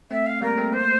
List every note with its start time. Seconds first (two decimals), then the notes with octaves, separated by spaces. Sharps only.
0.11 A3 C4 E5
0.26 F5
0.42 G3 A#3 A#4
0.57 A3 C4
0.73 A#3 C5
0.81 A3